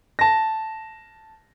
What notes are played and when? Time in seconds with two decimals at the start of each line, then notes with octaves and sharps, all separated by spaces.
0.19 A5 A#6